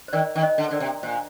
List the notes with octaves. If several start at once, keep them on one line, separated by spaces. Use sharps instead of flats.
C5
D#3 A#4 D5
D#3
C5 D#5
D3
D3 A#4 C5 D5
C3
A#2 C5